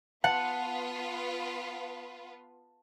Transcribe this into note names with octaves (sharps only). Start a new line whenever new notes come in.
B3 F4 B4 F#5 A5